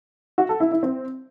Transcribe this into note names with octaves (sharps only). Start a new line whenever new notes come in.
F#4
A4
E4
E4
C4